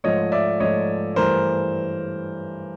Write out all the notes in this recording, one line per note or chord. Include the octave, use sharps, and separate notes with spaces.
G#2 F3 A3 C#5 D#5
D5 E5
G#2 F3 A3 C#5 D#5
G2 E3 A3 A#4 C5